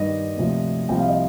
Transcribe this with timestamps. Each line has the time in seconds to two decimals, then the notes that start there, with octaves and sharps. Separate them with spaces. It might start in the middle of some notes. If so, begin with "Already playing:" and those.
Already playing: G2 D#3 D#5
0.36 D2 C3 F3
0.89 C2 C3 F3 G5
0.98 F5
1.08 D#5